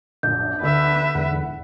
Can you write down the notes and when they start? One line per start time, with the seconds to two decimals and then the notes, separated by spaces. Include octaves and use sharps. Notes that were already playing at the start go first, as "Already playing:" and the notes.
0.23 A#1 F#2 D4 G6
0.62 D2 D3 B4 E5 E6
1.15 E2 G#2 D3 F#5